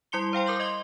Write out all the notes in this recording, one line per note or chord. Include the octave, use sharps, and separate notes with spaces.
G3 E4 C6 C#7 G7
C5 F5 G5 C6
A#4 D6 G6 F#7
D#5 C6 G7